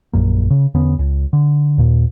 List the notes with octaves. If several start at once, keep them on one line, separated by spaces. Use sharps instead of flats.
A#1 F#2 A#3
C#3
E2 D3 B3 C#4
C#2
D3
D#2 A#2